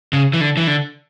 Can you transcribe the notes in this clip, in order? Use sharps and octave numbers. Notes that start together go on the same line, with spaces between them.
C#3
E3
D3
E3
D3